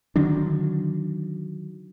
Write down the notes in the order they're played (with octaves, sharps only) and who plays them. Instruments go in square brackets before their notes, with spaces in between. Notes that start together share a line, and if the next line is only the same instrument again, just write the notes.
[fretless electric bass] D3 D#3 F#3 D4